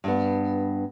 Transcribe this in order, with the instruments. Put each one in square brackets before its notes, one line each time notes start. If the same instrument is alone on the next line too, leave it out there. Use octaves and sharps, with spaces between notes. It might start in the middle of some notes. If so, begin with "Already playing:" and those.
[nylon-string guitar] G2 B3